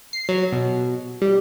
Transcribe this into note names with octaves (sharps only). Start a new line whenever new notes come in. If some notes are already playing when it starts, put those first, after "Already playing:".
C7
F#3
B2
G3